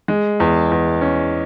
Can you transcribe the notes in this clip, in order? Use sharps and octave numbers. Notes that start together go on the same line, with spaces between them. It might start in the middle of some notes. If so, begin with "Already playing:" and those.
G#3
E2
E2
C#4